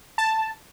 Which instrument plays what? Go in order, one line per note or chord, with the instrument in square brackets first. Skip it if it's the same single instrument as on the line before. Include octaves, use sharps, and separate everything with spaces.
[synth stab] A5